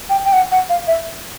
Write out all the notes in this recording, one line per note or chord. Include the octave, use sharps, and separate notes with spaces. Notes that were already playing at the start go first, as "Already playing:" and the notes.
G5
G5
F#5
F#5
F5
E5